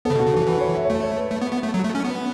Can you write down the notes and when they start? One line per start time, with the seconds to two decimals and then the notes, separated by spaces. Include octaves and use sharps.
0.05 C#3 B3 A4
0.15 B2
0.19 F#4
0.26 C#3
0.34 E3 F#4
0.47 E3 B4
0.61 C#5
0.75 E5
0.85 C#5
0.90 A3 E5
1.03 C#5
1.18 B4
1.31 A3
1.42 B3
1.52 B3
1.63 A3
1.74 F#3
1.84 A3
1.95 C#4
2.05 B3